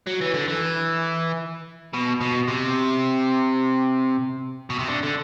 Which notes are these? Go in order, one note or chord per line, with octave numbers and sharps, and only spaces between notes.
F#3
E3
D3
E3
B2
B2
C3
B2
C3
D3
D3